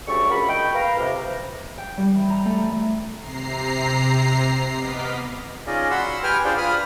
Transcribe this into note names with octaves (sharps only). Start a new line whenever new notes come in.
D2 C#3 G3 D5 E5 C#6
C#2 F#4 A#4 B5
D#5 G5
B4 F5 A#5
F2 C3
G5
G3
E3
A#5
A3
C3 A#5 C7
B3 D#5 D6 F6 B6
C#4 D#4 F4 G#4 D5 D#5
F#4 F#5 B5 C6 E6
G4 B4 G5 G#5 F6
D4 F4 G#4 C5 D5 G5
F4 B4 B5 D#6 F6